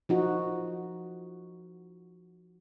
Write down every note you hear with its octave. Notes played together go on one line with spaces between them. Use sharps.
F3 D#4 F#4